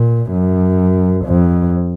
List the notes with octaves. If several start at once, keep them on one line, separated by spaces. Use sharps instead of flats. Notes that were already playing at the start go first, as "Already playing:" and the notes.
Already playing: A#2
F#2
F2